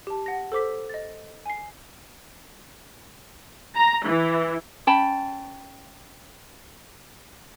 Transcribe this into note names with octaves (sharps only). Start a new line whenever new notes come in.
G4 A5
F#5 A#6
A4 C5 D6 B6
D#5 A6
G#5 C7
A#5
E3
C#4 G5 A5 B5